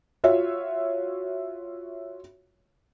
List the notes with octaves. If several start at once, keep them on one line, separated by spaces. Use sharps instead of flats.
F4 F#4 C#5 E5